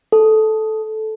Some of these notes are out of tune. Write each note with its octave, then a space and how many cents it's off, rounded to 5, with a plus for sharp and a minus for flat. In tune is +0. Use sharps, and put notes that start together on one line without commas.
A4 -10